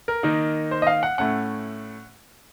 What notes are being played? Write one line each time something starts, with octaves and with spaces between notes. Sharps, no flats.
A#4
D#3 A#3 D#4
C5
D#5
F5
F#5
A2 A3 C#4 F#5